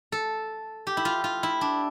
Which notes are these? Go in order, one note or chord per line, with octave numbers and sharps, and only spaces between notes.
A4
G4
E4
F4
F4
E4
D4